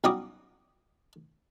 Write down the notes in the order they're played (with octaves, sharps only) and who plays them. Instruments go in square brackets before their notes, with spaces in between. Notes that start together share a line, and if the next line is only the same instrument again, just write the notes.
[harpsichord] B1 G3 C#4 F#4 D6 D#6